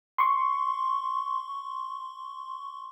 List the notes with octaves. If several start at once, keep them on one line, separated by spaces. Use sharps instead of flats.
C6 C#6